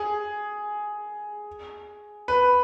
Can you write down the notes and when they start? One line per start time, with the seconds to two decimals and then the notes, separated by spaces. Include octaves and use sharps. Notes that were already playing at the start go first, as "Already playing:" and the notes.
Already playing: G#4
2.28 B4